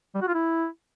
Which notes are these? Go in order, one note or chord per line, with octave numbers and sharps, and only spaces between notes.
G3
F#4
F4
E4